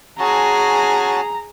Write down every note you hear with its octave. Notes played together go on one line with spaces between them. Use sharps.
C#4 F#4 G#4 A5 A#5